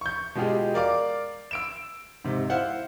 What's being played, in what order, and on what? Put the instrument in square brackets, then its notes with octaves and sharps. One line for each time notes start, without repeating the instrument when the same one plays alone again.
[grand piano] C#6 G6
B2 G#3 F4 G4 G#4
A#4 D5 F5 D6
E6 D7 E7
G#2 C3
E4 C5 F5 F#5